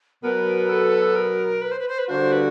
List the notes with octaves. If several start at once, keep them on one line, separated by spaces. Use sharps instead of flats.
B2 F#3 B3 A#4
A4
A#4
B4
C5
B4
C5
B4
D3 G3 A#3 D4 F#4 C5
B4